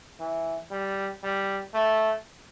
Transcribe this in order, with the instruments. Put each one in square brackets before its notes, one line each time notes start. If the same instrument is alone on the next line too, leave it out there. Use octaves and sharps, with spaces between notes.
[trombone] E3
G3
G3
A3